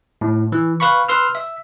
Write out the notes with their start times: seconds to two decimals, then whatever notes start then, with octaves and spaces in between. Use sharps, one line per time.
0.21 A2
0.52 E3
0.80 B4 F5 B5 C#6
1.08 B4 C6 E6 F6
1.35 E5